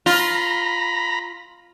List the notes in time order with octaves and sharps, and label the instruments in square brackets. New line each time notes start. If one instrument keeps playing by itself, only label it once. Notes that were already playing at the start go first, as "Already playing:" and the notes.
[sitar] F4 [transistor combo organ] A#5 B5